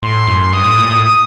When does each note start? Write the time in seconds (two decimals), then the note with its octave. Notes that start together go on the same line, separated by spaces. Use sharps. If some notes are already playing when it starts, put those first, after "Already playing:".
0.02 A2 C6
0.27 F#2
0.52 G2 D#6
0.64 A2
0.78 A#2
0.90 A2
1.03 D#6